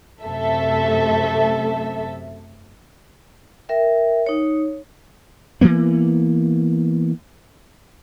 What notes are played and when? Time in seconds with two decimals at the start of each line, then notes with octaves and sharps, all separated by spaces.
0.25 F#2 C3 A3 A4 E5
3.69 A#4 E5 G5
4.26 D#4 C#5
5.61 E3 F#3 A#3 B3